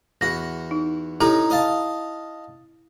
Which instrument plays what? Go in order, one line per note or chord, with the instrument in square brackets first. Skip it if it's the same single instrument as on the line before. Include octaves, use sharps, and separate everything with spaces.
[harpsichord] E2 F#4 [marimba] A#6
[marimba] D#4
[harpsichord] C#4 D#4 A#5 [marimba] E4 G4 A4
[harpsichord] D#5 F5 A5